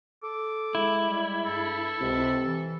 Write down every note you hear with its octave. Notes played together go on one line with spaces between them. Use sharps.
A4 D6
G#3 E4
G3
G2 A4
C#2 C3
E3